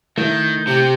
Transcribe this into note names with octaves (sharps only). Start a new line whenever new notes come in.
D#3 A3 E4 G6
C3 G4